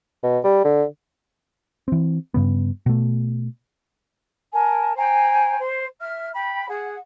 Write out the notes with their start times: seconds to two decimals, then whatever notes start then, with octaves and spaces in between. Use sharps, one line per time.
0.23 B2
0.44 G3
0.64 D3
1.88 E3 C4
2.34 G2 C#3 B3
2.86 B2 A3
4.52 A#4 G#5 A5
4.96 C5 G5 G#5 A#5
5.58 C5
6.00 E5 F6
6.33 G5 B5
6.68 G#4 F#5